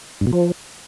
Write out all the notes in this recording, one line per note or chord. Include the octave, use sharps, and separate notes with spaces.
G2
B2
F3